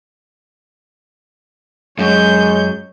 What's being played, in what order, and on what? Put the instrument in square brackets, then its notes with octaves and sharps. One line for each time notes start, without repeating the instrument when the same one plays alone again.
[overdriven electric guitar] F#2 [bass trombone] G#3 [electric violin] C#5 G6